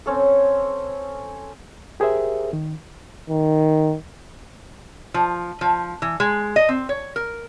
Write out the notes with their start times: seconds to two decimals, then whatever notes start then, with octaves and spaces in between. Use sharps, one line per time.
0.06 C4 C#4 A4
2.00 G4 G#4 A#4 C5 E5
2.53 D#3
3.30 D#3
5.14 F3
5.61 F3
6.02 E3
6.20 G#3
6.56 D#5
6.69 C4
6.89 C#5
7.16 A#4